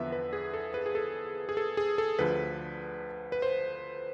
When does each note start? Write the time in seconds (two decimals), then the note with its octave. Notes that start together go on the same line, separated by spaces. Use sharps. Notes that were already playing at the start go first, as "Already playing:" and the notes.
Already playing: E2 D3 F3 B3 B4 E5
0.12 B4
0.33 G#4
0.54 A4
0.74 B4
0.86 G#4
0.95 A4
1.49 G#4
1.57 A4
1.77 G#4
1.98 A4
2.19 D2 D3 F3 B4
3.32 B4
3.42 C5